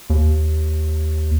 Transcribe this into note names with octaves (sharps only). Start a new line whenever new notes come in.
D#2